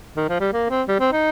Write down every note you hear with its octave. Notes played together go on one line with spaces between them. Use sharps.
D#3
F3
G3
A#3
C4
G3
C4
D#4